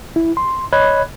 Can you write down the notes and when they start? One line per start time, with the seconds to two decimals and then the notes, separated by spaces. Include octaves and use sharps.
0.16 E4
0.37 C6
0.73 C#5 D#5 B5 F#6 G#6